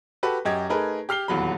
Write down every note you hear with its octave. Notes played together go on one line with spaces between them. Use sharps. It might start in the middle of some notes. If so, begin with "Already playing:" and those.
F#4 G4 A4 B4
F#2 G4 D#5 G#6
A3 D#4 G#4 A#4 B4
G4 F6 C7 G7
D#1 E2 F#3 B5